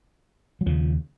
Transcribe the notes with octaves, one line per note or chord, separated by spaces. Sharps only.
F#3
D#2 C#3 F3